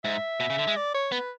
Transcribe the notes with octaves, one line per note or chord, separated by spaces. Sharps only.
G#2 E5
B2
C#3
D3
G#3
D5
C#5
B3 B4